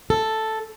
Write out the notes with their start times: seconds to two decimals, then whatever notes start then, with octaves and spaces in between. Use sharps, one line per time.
0.10 A4